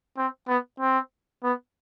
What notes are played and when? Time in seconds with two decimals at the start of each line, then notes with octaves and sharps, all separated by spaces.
0.17 C4
0.48 B3
0.80 C4
1.43 B3